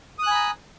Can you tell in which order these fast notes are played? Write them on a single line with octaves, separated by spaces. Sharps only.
D#6 F#6 G#5 B5 A#5